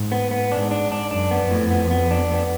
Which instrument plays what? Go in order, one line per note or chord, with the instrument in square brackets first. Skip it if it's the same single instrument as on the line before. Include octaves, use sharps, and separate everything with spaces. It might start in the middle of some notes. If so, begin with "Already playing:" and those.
Already playing: [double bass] G#2
[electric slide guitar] B3
B3
[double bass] G#2 [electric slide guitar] D4
[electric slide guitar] D4
D4
[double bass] F#2 [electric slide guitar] D4
[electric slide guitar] B3
[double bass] F2
[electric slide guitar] A2
B3
B3
D4
B3